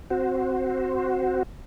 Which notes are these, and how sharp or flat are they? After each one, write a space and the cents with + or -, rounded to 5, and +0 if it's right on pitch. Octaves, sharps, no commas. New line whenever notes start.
C4 +0 F#4 +0 C5 +0